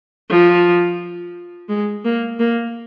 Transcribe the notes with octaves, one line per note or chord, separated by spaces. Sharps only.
F3
G#3
A#3
A#3